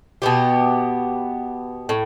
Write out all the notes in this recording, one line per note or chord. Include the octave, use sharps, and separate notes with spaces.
B2 B3 G4
A2